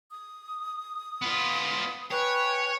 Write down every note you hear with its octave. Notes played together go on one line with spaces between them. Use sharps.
D#6
B3 F4
B4 C#5 G5 G#5